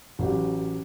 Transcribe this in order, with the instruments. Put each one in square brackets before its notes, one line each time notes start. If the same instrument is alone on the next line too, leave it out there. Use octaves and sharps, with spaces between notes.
[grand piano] A1 F#3 G4